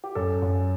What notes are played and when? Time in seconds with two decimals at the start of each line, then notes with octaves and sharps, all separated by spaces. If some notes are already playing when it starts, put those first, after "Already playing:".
0.04 G4
0.15 F#2 A4
0.42 F#2